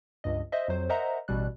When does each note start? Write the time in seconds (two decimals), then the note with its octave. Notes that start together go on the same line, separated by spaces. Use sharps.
0.24 C#2 G2 D#5
0.52 C5 D#5 E5
0.68 F2 F#3 C5
0.89 A#4 C5 D#5 E5 F#5 A#5
1.28 A1 B2 G3 F#6